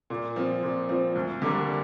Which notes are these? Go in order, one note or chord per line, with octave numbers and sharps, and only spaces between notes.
A#2
F3 C4
A#2
F3 C4
D2
D3 G3 A#3 D4